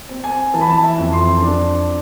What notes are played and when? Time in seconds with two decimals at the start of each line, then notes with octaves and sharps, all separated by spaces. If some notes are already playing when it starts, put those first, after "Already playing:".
0.09 C4
0.24 G#5
0.54 E3 A5
0.61 B5
0.69 A5
0.83 E5
0.98 F2
1.13 C6
1.42 D4